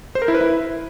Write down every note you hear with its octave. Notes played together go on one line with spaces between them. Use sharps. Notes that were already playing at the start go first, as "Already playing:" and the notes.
C5
A#4
E4
B4
E4